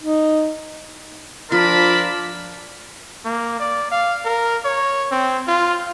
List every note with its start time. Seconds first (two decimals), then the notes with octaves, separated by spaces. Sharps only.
0.02 D#4
1.52 F3 D4 F4 A#4 A5 B5
3.25 A#3
3.60 D5
3.92 F5
4.25 A#4
4.65 C#5
5.11 C4
5.47 F4